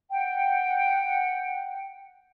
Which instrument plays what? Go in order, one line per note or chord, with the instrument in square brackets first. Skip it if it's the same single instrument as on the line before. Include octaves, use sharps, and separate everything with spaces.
[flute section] F#5 G5